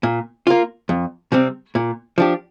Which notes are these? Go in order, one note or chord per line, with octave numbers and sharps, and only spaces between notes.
A#2
A#3 F4
F2
C3 G3 C4
A#2
F3 D4 G4